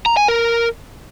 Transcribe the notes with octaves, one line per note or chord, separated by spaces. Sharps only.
A#5
G#5
A#4